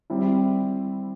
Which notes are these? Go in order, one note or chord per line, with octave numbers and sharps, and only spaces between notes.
G3 C4 E4